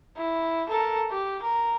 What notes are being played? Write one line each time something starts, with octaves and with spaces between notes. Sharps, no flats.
E4
A4 A#4
G4
A#4